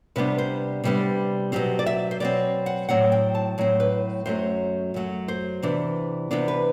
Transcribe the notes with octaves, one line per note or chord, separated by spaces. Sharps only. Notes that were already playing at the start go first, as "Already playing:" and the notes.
C3 G3 B3 D4 B4
C5
C3 G3 B3 D4
B2 F#3 C4 G4
D5
E5
C5
B2 F#3 C4 D5
F#5
A2 F#3 C4 F#5
G5
A5
A2 F#3 C4
B4
F#2 F#3 A3 C5
F#2 F#3 A3
C5
C3 E3 B3 D4
C3 E3 B3 D4
B4